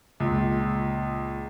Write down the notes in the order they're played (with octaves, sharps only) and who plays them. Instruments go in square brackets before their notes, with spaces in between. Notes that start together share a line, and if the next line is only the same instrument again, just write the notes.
[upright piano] C#2 A#2